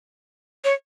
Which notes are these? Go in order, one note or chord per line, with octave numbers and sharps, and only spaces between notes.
C#5